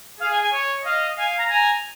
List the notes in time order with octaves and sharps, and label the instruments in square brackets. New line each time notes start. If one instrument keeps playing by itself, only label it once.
[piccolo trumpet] G#4 [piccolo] F5
[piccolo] G#5
G#5
[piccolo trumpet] C#5
[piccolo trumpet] D#5 [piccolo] F5
[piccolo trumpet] F5 [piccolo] G#5
[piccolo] A#5
[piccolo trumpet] G#5 [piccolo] A#5